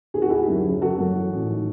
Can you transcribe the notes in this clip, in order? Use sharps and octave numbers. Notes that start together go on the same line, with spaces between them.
D#2 G#4
F#4
D#2 E4 G#4
F#2
F#1
F#1 F#4 A4
F#2
E3
A1
D#3